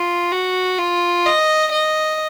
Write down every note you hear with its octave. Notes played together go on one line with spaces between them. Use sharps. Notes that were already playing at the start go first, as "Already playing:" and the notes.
Already playing: F4
F#4
F4
D#5
D#5